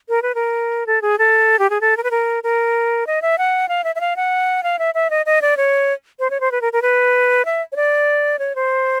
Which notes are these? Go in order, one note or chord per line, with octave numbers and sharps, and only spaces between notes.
A#4
B4
A#4
A4
G#4
A4
G4
G#4
A4
A#4
B4
A#4
A#4
D#5
E5
F#5
F5
E5
E5
F5
F#5
F5
E5
E5
D#5
D#5
D5
C#5
C5
C#5
C5
B4
A#4
A#4
B4
E5
C#5
D5
C#5
C5